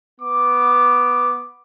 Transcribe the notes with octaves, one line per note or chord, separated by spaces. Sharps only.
B3 D6